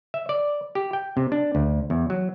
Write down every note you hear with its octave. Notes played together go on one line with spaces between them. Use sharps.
E5
D5
G4
G5
C3
D4
D2
E2
F#3